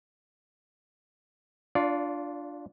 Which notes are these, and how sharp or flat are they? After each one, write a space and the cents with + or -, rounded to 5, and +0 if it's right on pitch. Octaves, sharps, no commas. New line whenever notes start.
D4 +0 F4 +0 D5 -35